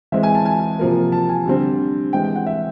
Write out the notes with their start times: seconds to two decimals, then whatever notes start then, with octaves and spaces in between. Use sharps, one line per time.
0.12 E3 G#3 C4 E5
0.23 G#5
0.35 A5
0.45 G#5
0.79 C3 F3 A#3
1.12 A5
1.29 G#5
1.46 D3 G3 C4
2.13 E3 G#3 C4 G5
2.24 G5
2.36 F#5
2.47 E5